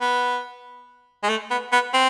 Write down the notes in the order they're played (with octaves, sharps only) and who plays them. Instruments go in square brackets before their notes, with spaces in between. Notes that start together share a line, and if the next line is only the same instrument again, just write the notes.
[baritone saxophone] B3
G#3
A3
B3
B3
C4